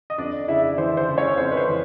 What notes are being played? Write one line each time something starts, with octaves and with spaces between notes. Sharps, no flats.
D#5
F2 D4 D5
C#3 E4 E5
E3 C5
C5
C#3
C#4 C#5
F2 C5
B4
C5
E3